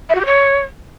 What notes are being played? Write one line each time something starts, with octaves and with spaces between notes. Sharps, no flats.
E5
F#4
G4
C#5